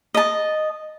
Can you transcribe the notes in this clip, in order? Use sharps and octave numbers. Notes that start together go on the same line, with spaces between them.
D#5 A5